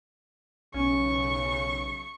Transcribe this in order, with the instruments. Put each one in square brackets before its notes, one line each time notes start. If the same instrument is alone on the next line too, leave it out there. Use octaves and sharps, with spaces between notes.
[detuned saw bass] B1 [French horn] C#3 [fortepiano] C#4 [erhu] C#6